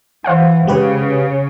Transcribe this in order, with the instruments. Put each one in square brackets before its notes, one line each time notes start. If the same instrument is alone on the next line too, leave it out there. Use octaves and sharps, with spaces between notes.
[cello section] E3 [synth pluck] C5 F5 F#5
[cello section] C#3 [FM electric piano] G#3 G4 B4